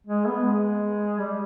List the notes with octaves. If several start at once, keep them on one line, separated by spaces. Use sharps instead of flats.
G#3
B3
G#3
G3